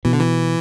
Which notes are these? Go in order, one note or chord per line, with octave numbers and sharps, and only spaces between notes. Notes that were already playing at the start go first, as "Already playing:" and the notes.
B2 E3
D3
E3